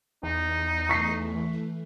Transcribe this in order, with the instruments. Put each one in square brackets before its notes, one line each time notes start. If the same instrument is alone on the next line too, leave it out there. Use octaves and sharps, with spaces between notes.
[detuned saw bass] E2 [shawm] D#4
[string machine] E3 A3 [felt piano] C#6 B6 C7